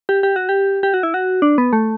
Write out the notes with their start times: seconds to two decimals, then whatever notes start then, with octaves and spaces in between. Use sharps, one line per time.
0.09 G4
0.23 G4
0.36 F#4
0.49 G4
0.83 G4
0.94 F#4
1.03 E4
1.14 F#4
1.42 D4
1.58 B3
1.73 A3